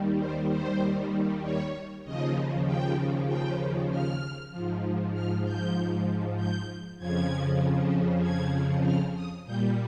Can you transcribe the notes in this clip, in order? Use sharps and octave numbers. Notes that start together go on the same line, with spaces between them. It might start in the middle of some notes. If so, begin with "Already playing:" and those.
Already playing: D#2 D#3 G3
C5
C5
C#5
D#2 C#3 F3 D#5
G5
G5
F6
G#2 F3
F6
G6
G6
F2 C#3 F3 G#6
G#6
F6
D#6
A#2 G3 G6